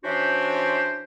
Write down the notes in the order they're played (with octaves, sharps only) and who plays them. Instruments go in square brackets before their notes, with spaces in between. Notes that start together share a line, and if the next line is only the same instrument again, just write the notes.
[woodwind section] E3 C#4 D4 F#4 G4 C5